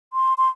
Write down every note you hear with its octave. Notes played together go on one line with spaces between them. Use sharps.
C6
C6